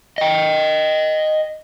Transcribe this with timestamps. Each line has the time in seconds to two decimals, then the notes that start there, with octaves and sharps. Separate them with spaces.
0.18 D#5 G5